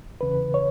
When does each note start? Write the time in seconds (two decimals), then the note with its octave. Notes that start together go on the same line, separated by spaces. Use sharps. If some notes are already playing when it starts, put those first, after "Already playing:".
0.20 E2 C#3 E3 B4
0.54 C#5